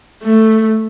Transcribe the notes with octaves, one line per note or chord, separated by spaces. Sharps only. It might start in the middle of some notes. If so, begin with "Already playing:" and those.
A3